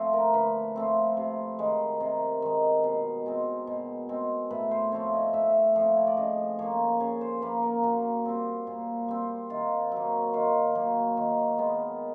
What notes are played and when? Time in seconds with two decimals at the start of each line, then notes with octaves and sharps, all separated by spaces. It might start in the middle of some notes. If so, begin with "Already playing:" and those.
Already playing: F3 A3 C4
0.13 A#4
0.34 D3 B4
0.76 F3 A3 C4
1.17 C3
1.59 D#3 G#3
2.00 C3 A#4
2.42 D#3 G#3
2.84 B2
3.26 G#3 C4
3.67 B2
4.09 G#3 C4
4.50 A2 B4
4.71 C5
4.92 F3 A3 C4 C#5
5.13 D#5
5.33 A2 E5
5.50 E5
5.76 F3 A3 C4
5.97 C#5
6.07 D5
6.17 C#3 D#5
6.59 F3 A#3 C#5
7.00 C#3 C#5
7.21 C5
7.42 F3 A#3 B4
7.63 A#4
7.83 A#2 F#4
8.25 G3 C4
8.67 A#2
9.08 G3 C4
9.50 D#3 F4
9.92 F#3 A#3
10.33 D#3 F4
10.75 F#3 A#3
11.17 D#3
11.59 G#3 B3